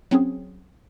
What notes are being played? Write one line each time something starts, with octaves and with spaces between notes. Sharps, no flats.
F#3 C4 C#4 G#4